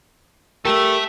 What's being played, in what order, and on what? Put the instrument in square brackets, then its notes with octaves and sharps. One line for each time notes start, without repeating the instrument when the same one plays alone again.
[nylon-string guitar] G3 A#4 [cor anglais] A3 [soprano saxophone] G4 [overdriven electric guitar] A4 E5